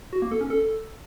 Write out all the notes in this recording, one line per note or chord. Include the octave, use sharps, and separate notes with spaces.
F#4
A#3
A4
C#4
A4